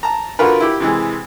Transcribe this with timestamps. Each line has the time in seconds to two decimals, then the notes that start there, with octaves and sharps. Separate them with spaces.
0.03 A5 A#5
0.39 D3 F4 F#4 A#4 B4
0.60 E4 G4
0.80 C3 E3 G#3